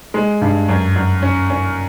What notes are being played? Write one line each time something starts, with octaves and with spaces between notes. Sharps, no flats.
G#3
G2
F#2
F#2
C#4
C#4